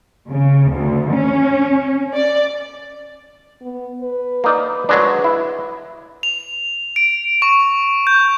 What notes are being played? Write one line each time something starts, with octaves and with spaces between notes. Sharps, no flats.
C#3
D2
C#4
D5
B3
B4
A#3 D#4 D5
F#3 G#3 D4
E4
F7
D7
C#6
G6